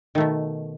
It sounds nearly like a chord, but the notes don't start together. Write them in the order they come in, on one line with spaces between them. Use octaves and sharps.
D#3 A3 B2